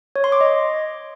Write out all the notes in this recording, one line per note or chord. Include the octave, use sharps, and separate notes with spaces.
C#5
C6
D6
D#5